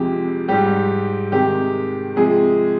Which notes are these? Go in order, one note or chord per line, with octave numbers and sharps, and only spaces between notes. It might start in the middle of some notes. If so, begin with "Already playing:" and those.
Already playing: F2 C3 F3 G#3 G4
G#2 G3 G4
C3 D#3 G#3 G4
C3 F3 G#3 G#4